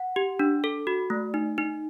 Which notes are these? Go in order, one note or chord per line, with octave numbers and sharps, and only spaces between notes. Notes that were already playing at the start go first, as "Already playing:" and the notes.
Already playing: F#5
G4
D4
A4
F#4
A3
D#4
D#4